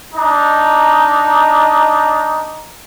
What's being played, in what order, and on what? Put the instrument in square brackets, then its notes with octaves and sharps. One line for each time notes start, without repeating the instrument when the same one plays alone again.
[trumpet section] D4 D#4